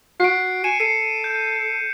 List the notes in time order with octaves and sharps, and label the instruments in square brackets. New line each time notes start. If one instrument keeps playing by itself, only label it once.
[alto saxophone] F#4 [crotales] C7 D7
[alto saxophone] G#5 [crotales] C#7 D#7 E7
[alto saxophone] A4 [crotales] C7 C#7 D#7
[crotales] G6